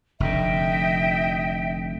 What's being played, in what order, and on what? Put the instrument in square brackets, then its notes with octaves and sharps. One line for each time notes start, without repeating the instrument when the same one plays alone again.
[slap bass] F1 D3 [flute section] D#5 E5 G5